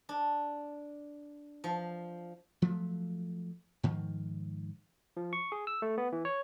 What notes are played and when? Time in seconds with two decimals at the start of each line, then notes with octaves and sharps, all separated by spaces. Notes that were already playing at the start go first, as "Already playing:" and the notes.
0.09 D4
1.64 F3
2.62 F3 F#3 A3
3.83 G#2 D#3 F3
5.17 F3
5.33 C#6
5.52 G#4
5.67 E6
5.82 A3
5.98 B3
6.12 E3
6.25 C#5